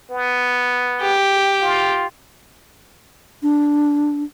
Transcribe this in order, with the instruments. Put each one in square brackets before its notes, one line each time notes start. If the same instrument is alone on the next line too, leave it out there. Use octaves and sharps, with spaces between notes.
[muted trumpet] B3
[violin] G4
[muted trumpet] F4
[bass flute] D4